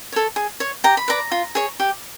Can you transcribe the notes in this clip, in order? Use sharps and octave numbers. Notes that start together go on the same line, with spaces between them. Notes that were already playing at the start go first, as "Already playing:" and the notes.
A4 C#5
G#4
C#5
G4 A#5
B5
B4 D5 A#5
F4
G#4 C#5
G4